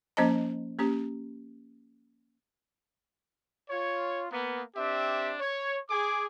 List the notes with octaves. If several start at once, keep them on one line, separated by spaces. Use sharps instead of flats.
F3 A#3 C#4 C5 D#5 A5
A#3 C#4 G4
F4 C#5
A#3 B3
C4 D4 G4 E5
C#5
G#4 D6